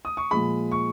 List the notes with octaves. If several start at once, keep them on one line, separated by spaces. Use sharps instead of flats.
D#6
C#6
A#2 F3 G#3 B5
C#6